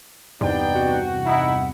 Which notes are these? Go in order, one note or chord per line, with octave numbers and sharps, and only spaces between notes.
E2 G2 C3 B3 D#4 D5 G5
F#4
D#4 E4 F#5